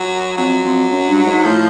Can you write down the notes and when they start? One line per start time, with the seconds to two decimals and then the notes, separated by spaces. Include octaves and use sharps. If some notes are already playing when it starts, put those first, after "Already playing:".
Already playing: F#3
0.37 F2 F#3
0.64 F2
0.92 F#2
1.09 G2
1.26 G#2
1.44 A2 F3